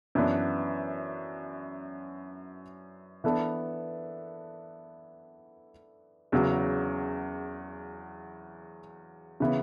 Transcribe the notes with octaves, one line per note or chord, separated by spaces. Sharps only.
F#2 E3 B3 D4
E3 B3 D4 A4
E2 C#3 F#3
C#3 E3 B3